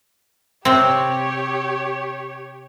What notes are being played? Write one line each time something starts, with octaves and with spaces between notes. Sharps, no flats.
C3 C4 G4 C#5